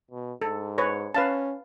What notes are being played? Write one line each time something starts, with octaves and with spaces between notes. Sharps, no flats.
B2
G#2 A4
B4 C#5
C#4 B4 F5 A5